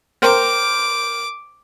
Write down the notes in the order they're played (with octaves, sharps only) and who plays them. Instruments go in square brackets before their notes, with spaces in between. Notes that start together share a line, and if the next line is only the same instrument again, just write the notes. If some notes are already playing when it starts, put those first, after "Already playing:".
[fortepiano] A#4 C5 G5 [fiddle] D6